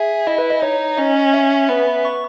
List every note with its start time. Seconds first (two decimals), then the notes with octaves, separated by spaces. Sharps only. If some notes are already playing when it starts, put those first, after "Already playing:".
Already playing: G#4 E5
0.27 E4 D#5
0.38 B4
0.50 D#5
0.62 D#4 C#5
0.98 C#4 D#5
1.33 E5
1.69 B3
2.05 C#6